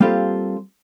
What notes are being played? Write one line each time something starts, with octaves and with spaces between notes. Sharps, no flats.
G3 A#3 C4 F4 G4 A4